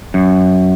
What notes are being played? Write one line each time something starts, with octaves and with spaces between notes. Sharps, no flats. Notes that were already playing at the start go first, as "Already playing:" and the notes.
F#2